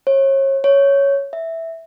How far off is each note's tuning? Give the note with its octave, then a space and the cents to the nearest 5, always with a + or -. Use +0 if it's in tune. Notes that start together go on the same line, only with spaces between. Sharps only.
C#5 -35
C#5 +5
E5 -5